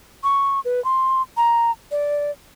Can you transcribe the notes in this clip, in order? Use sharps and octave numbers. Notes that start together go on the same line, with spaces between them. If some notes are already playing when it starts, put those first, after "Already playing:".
C#6
B4
C6
A#5
D5